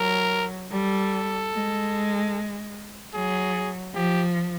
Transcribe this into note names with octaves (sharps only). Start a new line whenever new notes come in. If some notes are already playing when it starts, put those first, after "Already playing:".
Already playing: F#3 A#4
G3 A4
G#3
F#3 G#4
F3 G4